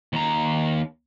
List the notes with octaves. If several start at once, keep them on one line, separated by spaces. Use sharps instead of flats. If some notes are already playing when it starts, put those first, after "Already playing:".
D#2 A#5